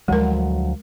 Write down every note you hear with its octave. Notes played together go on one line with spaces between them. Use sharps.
D2 F3 F#3 G#3 A#4